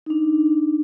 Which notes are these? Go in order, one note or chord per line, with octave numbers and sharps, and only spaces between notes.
D4 D#4